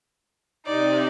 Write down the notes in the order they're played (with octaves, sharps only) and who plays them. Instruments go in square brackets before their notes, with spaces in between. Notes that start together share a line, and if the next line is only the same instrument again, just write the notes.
[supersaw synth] C3 [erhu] D#4 [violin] D5